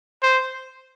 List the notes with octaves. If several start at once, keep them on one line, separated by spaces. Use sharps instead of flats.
C5